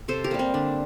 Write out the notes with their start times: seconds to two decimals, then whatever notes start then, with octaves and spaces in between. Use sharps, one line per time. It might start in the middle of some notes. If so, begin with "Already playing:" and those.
0.08 C3 A4 C5
0.24 G4 A#4
0.31 G3 A#3
0.39 C4
0.54 D3 D4